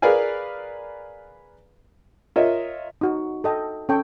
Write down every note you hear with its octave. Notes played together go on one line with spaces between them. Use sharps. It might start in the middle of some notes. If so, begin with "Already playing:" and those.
G#4 A#4 B4 D5 F5 G#5
F4 A#4 C#5 D#5 E5
D#4 F#4
A4 D#5 G5
C#4 A4 G5 C#6